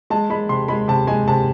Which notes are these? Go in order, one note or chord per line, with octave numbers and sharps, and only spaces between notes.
G#3 A5
G#3 B5
C3 C6
G#3 B5
C3 A5
G#3 G#5
C3 A5